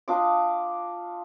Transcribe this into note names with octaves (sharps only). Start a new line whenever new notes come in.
D4 F4 D#5 D6